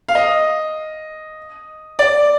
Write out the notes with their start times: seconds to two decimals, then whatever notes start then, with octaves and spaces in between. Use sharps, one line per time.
0.08 F5
0.15 D#5
1.99 D5